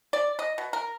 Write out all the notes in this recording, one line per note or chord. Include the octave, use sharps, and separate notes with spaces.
D5
D#5
B2
A#4